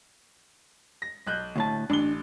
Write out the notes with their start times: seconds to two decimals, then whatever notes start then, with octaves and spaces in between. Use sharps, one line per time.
1.02 A#6
1.27 B1 F#6 G6
1.56 D2 A2 A5
1.90 A1 D4 G7